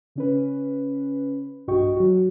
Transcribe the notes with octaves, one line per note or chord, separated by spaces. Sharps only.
C#3 C#4 B4
B1 G2 F#4 D#5 G5 C#6
F#3 F#4